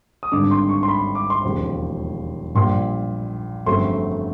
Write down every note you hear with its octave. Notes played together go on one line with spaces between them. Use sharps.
D#6
G#1 G2 D3 D6
C6
C#6
C6
B5
D6
C6
E1 D#2 C#3 F3
A#1 A#2 G3 C6
G1 F2 C#3 F#3 A3 C6